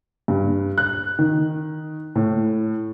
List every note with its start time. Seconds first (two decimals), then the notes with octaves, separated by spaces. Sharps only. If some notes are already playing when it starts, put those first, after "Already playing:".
0.28 G2
0.78 F#6
1.19 D#3
2.15 A2